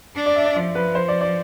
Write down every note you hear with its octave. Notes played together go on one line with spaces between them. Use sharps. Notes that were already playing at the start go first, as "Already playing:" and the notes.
D4
D5
E5
D5
F3 D5
B4
C5
D5
D5